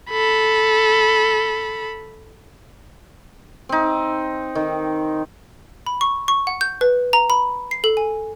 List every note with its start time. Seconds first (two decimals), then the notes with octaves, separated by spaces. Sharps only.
0.10 A4 B5
3.69 C4 D#4
4.55 D#3
5.86 B5
6.01 C#6
6.28 C#6
6.47 F#5
6.61 G6
6.81 B4
7.13 A#5
7.30 B5
7.71 C7
7.84 A4
7.97 G#5